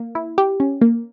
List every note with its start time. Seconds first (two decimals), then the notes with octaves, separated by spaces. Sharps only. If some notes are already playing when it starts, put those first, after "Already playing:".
Already playing: A#3
0.15 E4
0.38 G4
0.60 C#4
0.81 A#3